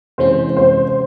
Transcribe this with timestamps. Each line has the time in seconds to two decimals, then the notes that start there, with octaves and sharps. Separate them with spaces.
0.18 C3 E3 G#3 C#4 C5
0.57 C5